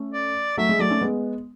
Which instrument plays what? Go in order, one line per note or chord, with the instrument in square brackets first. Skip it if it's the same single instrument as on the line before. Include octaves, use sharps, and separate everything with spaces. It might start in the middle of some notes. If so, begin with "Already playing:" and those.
Already playing: [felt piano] A3 C#4
[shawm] D5
[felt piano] F#3 A3 [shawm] E5
[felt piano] G#3
[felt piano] F#3 A3 [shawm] D5
[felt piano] A3 C#4
G#3 B3